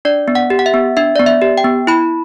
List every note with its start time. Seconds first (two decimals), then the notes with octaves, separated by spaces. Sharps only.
0.05 D4 D5
0.28 B3
0.35 F#5
0.50 G4
0.59 F#5
0.66 E5
0.74 B3
0.97 D4 E5
1.16 B3 D5
1.26 E5
1.42 G4
1.58 G5
1.64 B3
1.87 E4 B5